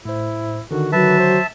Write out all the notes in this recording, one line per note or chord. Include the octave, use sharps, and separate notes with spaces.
A2 E4 C5
D3 D#3 F#4
F#3 B4 E5 A5
C5